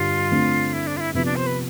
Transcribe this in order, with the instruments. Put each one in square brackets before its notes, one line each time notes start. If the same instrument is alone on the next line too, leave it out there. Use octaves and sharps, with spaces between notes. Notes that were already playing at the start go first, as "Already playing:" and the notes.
Already playing: [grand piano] G2 D3 G3 [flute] F4
[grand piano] D3 A3 C4
[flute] E4
D4
F4
E4
[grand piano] C3 F3 B3 [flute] E4
[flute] D4
C5
B4